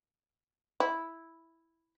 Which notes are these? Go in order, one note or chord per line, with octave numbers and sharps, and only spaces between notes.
E4